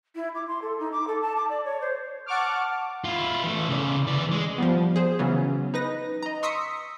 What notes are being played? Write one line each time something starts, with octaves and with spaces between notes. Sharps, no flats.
E4
D6
C6
A4
D#4
D6
A4
A5
D6
D5
C#5
C5
F#5 A5 C#6 D6 F6
E4 F4
E3 A3
C#3 D5
E3 D5
G#3
F3 G3 B3
G#4 C5
C#3 E3 F#3 B3 C#4
D#4 B4 A#6
D#5 A#5
C6 C#6 D#6 E6 B6 C#7